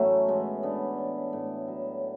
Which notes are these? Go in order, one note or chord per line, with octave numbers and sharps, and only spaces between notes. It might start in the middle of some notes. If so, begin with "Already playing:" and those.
Already playing: A2 E3 F#3 A3 B3 C#4
E3 G#3 B3
A2 B3 D4
E3
A2
F#3